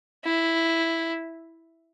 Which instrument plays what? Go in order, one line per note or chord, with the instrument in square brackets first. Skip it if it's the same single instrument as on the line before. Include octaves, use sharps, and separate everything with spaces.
[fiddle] E4